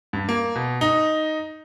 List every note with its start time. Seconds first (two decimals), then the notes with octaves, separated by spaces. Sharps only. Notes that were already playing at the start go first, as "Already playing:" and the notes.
0.13 G2
0.29 A#3
0.55 B2
0.81 D#4